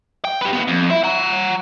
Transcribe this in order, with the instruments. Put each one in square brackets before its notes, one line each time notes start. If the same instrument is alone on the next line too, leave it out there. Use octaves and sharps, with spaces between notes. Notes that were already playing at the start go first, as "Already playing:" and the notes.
[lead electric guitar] G5
G4 B4
D#2 B3
F2
E4 E5
F#5 A#5